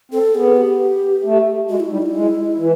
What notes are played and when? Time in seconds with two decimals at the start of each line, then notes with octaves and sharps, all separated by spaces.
0.12 C4 A4
0.34 B3 G#4
0.57 G4
1.24 A3
1.69 G#3 F#4
1.80 E4
1.91 G3 D#4
2.02 F4
2.06 E4
2.14 G#3
2.58 E3